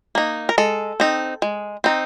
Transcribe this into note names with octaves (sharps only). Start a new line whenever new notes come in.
A#3 D#4
A#4
G#3 A4
C4 D#4
G#3
C4 D#4